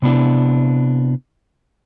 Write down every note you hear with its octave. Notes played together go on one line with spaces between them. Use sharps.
C3 B3 D4 E4